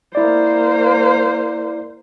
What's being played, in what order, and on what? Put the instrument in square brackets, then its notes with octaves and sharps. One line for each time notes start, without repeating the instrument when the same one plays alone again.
[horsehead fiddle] A#3 C5 [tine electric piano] E4 D5